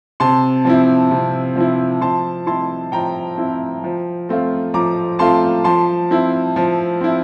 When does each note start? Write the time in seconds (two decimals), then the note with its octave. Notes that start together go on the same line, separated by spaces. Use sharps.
0.20 C3 A5 C6
0.65 F3 C4 E4
1.11 C3
1.56 F3 C4 E4
2.01 F3 A5 C6
2.46 C4 E4 A5 C6
2.92 F3 G5 A#5
3.38 C4 E4
3.84 F3
4.29 A3 C4 F4
4.74 F3 A#5 D6
5.19 A3 C4 F4 A5 C6
5.64 F3 A5 C6
6.11 C4 E4
6.56 F3
7.01 C4 E4